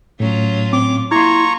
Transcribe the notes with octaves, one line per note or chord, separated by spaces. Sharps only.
A2 F#3 C#4 F4
C4 D6
A#3 E4 F4 A#5 C6 C#6 G#6